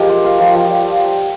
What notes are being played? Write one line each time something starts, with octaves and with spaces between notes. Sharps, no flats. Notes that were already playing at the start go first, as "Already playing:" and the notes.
Already playing: F3 G#3 G4 A#4
F4
F4 F5
F3
F3
G3